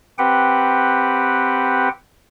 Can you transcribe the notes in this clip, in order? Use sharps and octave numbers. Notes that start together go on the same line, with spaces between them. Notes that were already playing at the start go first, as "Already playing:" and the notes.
C4 G4 B4 F#5 G5